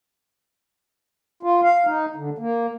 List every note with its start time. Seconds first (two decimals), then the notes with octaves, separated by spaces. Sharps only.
1.43 F4
1.63 F5
1.86 D#4
2.16 D3
2.39 A#3